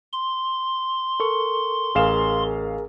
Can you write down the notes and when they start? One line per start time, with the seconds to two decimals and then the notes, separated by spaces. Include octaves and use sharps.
0.13 C6
1.20 A4 A#4 C#6
1.95 A1 G#4 A#4 F5 E7